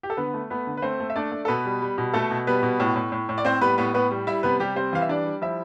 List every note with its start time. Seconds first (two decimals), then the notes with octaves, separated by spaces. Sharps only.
0.03 G4
0.10 A4
0.17 D3 B3 B4
0.34 A3
0.50 A3 B3 B4
0.67 D3
0.77 B4
0.82 A3 C4 C5
1.00 A3
1.10 E5
1.16 A3 D4 D5
1.32 A3
1.45 A4
1.48 B2 B3 B4
1.65 G3
1.82 G3
1.98 B2
2.13 B2 A3 A4
2.31 B2
2.47 G3 B3 B4
2.63 B2
2.80 A2
2.96 A2
3.12 A2
3.29 A2
3.38 D5
3.45 A2 C4 C5
3.61 G3 B3 B4
3.78 A2 B3 B4
3.94 A2 B3 B4
4.11 G3
4.27 G3 E4 E5
4.43 C3 B3 B4
4.60 C3 G3 G4
4.76 G3 C4 C5
4.93 E3 F5
5.02 E5
5.09 G3 D4 D5
5.26 G3
5.42 F3 E4 E5